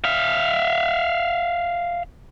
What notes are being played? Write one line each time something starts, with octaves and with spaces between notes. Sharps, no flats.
E5 F5